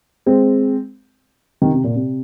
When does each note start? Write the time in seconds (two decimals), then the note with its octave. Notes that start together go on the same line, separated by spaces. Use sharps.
0.26 G#3 C4
1.62 C3 D#3
1.74 C3
1.84 A#2
1.96 C3